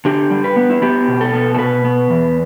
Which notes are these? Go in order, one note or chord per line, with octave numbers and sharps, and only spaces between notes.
D3 G4
G3
B4
B3
E4
B3 G4
B2
A4
B3
A4
B2 B4
B3
E2